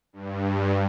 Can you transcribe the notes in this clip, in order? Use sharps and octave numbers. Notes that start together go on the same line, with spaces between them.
G2